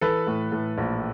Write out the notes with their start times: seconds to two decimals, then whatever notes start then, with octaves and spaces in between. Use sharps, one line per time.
0.01 E3 A4 B4
0.27 A2
0.52 A2
0.78 A#1